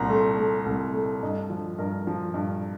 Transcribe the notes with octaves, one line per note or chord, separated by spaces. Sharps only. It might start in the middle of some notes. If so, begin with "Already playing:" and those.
Already playing: C2 A#2 A#5 C6
A3
A3
C2
A3
G2 D#5
F3
G2 A#4
F3
G2